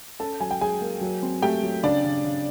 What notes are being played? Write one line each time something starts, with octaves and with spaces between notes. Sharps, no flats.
C#4 A4 A5
F#3 G#5
G5
F#3 G#4 G#5
A#3
F#3
C4
A3 G4 G5
F#3
C#3 D4 D5
C#3
C#3